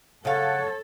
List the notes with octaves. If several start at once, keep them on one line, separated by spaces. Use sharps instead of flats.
C#3 A4 C#5 F5 F#5